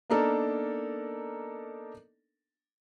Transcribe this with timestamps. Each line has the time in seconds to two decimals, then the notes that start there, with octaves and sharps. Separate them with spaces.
0.10 A#3 B3 D4 D#4 A4 A#4